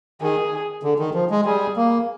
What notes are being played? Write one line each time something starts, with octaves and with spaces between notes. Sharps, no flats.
D#3 G#4
D3
D#3
F3
G#3
G3 G#4
A#3